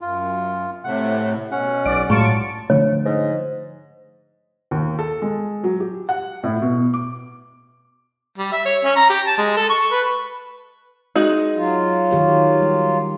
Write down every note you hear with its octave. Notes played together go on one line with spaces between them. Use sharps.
F#2 F4
A2 C3 A3 F#5
B2 C#4 F#5
B1 D5 D7
A2 F#3 G#3 F4 A5 C#6 D7
D3 F3 A3 C#5
G#2
D#2
A4
G#3
F#3
G4
F#5
A2
B2
D6
G3
E5
C#5
C#4
A#5
G4
A5
G#3
A4
C#6
B4
G#3 D#4 F#4
F#3 F4
D#3 G4 C#5
G3